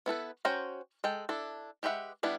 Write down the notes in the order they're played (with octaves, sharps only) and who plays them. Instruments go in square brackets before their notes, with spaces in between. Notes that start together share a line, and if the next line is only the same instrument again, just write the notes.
[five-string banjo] B3 E4 A4 B4
C#4 F#4 C5 G5 A#5
G#3 A4 G5
D4 E4 A4
G#3 G4 B4 E5 F#5
G3 B3 D4 E4